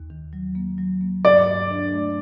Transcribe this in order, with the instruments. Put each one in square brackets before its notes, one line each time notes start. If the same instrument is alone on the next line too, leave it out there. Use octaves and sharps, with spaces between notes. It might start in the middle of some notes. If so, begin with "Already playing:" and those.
Already playing: [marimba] D#2
D#3
F#3
A#3
F#3
A#3
[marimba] G2 [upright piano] D5
[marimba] G2
D4
A3